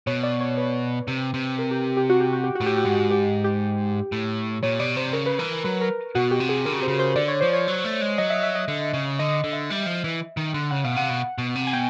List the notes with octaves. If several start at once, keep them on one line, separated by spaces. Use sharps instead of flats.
B2 C#5
D5
C#5
B4
C3
C3
A#4
G4
G4
F#4
G4
F#4
G4
F#4
A2
G4
F#4
G#2
G4
G4
A2
A#2 C#5
B2 D5
C3 C5
C#3 A#4
B4
E3 A#4
A#4
F#3 B4
A#4
B2 F#4
G4
C3
G#4
D3 A#4
C#3
C3 C5
C#3
C5
D3 D5
C#5
F3 C5
C#5
F#3
A3
G#3
F#3 D#5
E5
E5
D#5
D3
C#3
D3 D#5
D#5
D3
E5
G3
F3
E3
D#3
D3
C#3 F#5
B2 F5
C3 F#5
B2
B2
C3
G#5
B2 G5